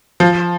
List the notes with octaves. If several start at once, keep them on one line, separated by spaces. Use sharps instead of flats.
F3